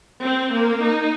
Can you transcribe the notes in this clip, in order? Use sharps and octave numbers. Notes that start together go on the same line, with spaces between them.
C4
A#3
D#4